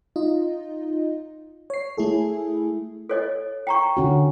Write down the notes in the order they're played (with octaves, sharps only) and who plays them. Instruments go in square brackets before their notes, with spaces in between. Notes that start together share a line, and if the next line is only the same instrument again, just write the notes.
[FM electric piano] D#4 F4 D#5
C#5 C7
A3 E4 G#4 A4
[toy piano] A4 C#5 D#5
G5 A#5 C#6
[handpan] D3 C#4 F#4